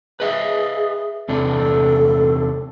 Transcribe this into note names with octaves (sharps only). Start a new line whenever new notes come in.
G#4 B4 D#5 E5
E2 C3 D4 A4